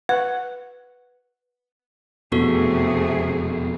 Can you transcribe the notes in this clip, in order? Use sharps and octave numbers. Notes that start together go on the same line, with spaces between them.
B4 F#5
E1 F2 C3 A3 B3 F#4 G#4 A4